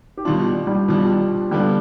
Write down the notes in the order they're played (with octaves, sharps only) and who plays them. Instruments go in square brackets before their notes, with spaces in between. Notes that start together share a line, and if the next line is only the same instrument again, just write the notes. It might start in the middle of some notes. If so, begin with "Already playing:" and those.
[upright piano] G4
[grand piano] B2 G3 D4 [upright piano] F4
[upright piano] G3
[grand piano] B2 G3 D4 [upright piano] F3
[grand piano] D3 F3 B3 D4 [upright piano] G3